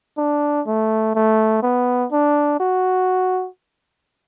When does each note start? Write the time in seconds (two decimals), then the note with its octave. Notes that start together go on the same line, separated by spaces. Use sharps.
0.18 D4
0.66 A3
1.15 A3
1.63 B3
2.12 D4
2.60 F#4